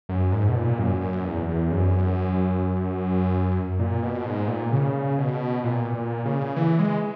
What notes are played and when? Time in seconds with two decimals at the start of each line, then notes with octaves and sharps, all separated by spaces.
0.09 F#2
0.32 G#2
0.49 B2
0.55 A#2
0.79 F#2
1.01 F#2
1.25 E2
1.48 E2
1.71 F#2
3.79 A#2
4.03 B2
4.26 G#2
4.48 A#2
4.72 C#3
5.18 B2
5.64 A#2
5.94 A#2
6.25 C#3
6.56 E3
6.79 G#3